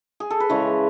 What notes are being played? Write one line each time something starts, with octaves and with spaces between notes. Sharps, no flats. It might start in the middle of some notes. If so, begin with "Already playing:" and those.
G#4
A4
B4
C#3 E3 G#3 C#5